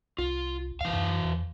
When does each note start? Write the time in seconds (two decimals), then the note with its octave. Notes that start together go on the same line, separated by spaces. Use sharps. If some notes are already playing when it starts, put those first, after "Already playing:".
0.18 C2 F4
0.81 D2 E3 F5
0.93 F#2
1.24 E2